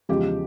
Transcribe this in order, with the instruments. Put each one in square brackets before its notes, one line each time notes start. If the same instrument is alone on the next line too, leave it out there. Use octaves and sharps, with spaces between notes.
[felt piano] E2 C#3 F3 G#3 G4